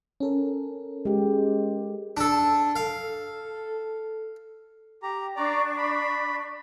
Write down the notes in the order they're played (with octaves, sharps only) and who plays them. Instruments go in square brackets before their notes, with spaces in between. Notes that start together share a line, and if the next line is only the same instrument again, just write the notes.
[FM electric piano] C#4 A4 A#4
[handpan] G#3 G4
[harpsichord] D4 A4
[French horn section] A4 [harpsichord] F5
[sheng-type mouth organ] G4 A#5
[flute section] D4 C#6 [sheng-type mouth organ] D5 A#5
[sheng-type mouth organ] B5